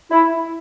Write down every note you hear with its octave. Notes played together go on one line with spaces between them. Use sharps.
E4